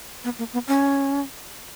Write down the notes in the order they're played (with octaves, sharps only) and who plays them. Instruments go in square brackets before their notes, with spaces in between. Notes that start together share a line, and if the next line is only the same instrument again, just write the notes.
[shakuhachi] B3
A#3
B3
C#4